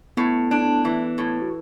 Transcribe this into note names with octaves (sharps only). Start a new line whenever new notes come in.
A2 B3
D4
E3
A2
F#4